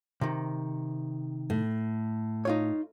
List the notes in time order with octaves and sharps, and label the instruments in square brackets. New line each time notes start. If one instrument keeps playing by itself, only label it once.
[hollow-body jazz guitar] C3 D#3
[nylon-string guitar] A2
[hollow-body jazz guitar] D#4 F4 C#5